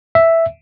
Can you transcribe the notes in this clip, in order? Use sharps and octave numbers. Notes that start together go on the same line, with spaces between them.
E5